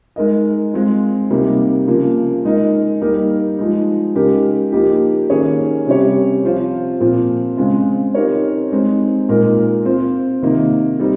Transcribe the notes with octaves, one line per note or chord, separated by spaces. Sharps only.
G#3 D#4 A#4 D#5
G#3 C4 F4
C3 G3 A#3 D#4 G4
C#3 F3 A#3
G#3 D#4 A#4 D#5
G3 A#3 D#4 G4 A#4
F3 G#3 D#4
C#3 G#3 D#4 G4 A#4
F3 A#3 D#4 G4
D#3 A#3 C#4 G#4 C#5
C3 G3 C#4 G4 C#5
F3 C4 F4 C5
A#2 F3 C4
C#3 G#3 C4 F4
C4 D#4 G4 A#4 C#5
G#3 C4 D#4
A#2 G#3 D#4 A#4
C4 F4 C5
C3 D#3 A#3 D#4
G3 C4 D#4